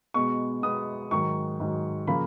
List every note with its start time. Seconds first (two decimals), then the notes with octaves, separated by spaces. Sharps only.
0.14 B2 G#3 B3 C#6
0.62 B2 G#3 B3 D#6
1.11 G#2 D#3 F#3 C#6
1.60 G#2 D#3 F#3
2.07 C#3 F3 A#3 B5